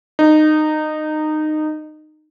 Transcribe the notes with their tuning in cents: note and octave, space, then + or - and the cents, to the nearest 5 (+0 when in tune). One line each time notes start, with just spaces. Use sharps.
D#4 -20